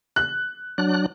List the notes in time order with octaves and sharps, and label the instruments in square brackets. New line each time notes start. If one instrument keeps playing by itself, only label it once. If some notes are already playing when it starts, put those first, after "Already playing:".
[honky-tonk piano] F#6
[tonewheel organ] F#3 D4 F#6